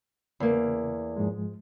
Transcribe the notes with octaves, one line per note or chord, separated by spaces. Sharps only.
E2 C#3 A#3
G#2 F3 G#3